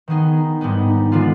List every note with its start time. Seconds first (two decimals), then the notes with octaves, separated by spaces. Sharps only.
0.08 D#3 B3 D#4 G#4
0.61 G#2 G3 B3 D#4
1.12 D3 G#3 B3 F4